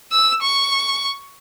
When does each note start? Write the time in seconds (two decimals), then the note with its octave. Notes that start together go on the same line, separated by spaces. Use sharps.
0.12 E6
0.42 C#6